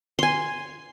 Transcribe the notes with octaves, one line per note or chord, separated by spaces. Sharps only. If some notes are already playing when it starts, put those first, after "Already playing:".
G#5 C6